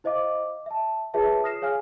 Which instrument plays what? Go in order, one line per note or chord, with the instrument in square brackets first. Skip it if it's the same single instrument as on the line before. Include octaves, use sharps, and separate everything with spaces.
[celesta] E4 C5 D#5 F5 D6
E5 A5
F4 G#4 B4 C#5 E5 A5
D#6 F6 A#6 C7 E7
G#4 C#5 F5 G#5 F6